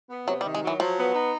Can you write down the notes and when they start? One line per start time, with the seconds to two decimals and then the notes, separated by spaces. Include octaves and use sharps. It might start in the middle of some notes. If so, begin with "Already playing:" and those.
0.10 B3
0.27 C3 F#3
0.41 G3
0.45 D#3
0.54 G#3
0.63 E3 F#3
0.80 F3 F#3
0.98 B3
1.15 D#4